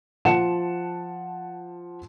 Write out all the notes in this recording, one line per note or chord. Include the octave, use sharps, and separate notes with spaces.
F3 F#5 A5 C#7 E7